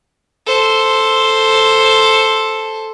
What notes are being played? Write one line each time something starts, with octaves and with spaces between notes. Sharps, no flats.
A4 C5